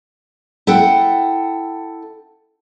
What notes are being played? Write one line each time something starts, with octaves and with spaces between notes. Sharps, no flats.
E4 A4 F#5 G5